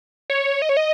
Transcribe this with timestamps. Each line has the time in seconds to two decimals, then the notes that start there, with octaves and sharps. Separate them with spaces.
0.30 C#5
0.62 D#5
0.69 C#5
0.77 D#5